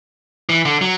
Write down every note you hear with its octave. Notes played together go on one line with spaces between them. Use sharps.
E3
D3
F#3